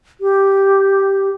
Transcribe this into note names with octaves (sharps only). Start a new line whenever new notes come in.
G4